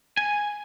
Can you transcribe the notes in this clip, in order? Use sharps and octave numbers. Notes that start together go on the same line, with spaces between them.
G#5